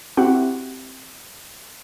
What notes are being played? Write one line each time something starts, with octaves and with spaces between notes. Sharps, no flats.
C4 E4 F#4 G4 F#5